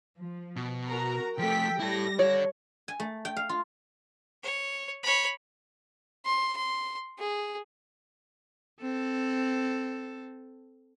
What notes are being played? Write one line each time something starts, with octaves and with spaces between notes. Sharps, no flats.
F3
B2
F#4 A#4 A#5
F3 A3 A4 G5 B6
G3 E4 A4 A#6
A4 C#5 D5
G#5
A3
G5
F5
F4
C#5
C#5 B5
C6
C6
G#4
C4 A4